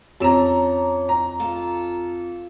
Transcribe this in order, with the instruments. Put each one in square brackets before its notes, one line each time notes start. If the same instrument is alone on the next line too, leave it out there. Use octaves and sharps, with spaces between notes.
[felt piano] F2 E6 E7 [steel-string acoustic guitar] C#4 [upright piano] A5 A#5
[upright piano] A#5
[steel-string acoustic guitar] F4 A4